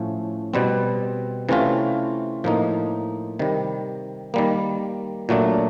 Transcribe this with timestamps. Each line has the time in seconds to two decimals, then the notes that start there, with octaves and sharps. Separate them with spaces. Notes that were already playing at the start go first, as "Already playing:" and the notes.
Already playing: A2 F3 A3 C#4
0.54 B2 G3 C4
1.49 C3 E3 A3 C#4 F4
2.44 A2 F3 A#3 D#4
3.39 C3 D#3 G3
4.34 D#3 G3 A#3
5.29 A#2 F#3 A3 D4